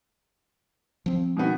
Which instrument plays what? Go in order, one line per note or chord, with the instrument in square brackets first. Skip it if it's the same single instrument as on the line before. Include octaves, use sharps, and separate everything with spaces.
[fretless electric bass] F3 C4
[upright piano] B2 D#3 B3